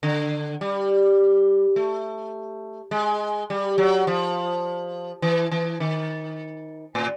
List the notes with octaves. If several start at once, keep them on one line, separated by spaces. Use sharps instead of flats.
D3
G3
A3
G#3
G3
F#3
F3
E3
E3
D#3
A2